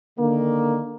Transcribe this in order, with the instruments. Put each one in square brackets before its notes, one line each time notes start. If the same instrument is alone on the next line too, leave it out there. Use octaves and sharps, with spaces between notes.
[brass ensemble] D3 D#3 A#3